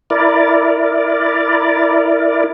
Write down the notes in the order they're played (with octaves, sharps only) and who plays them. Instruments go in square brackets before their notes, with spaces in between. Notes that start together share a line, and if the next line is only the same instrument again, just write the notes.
[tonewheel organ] E4 A#4 D5